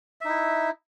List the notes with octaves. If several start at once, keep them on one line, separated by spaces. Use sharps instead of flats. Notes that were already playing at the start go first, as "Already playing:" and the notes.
D#4 E4 E5